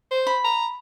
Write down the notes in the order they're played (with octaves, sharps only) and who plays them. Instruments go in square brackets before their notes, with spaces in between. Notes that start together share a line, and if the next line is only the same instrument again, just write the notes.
[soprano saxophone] C5
[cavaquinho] B5
[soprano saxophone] A#5